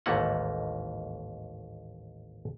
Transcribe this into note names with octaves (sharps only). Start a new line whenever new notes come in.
A1 D#2 G#2 A3 A#3 F#5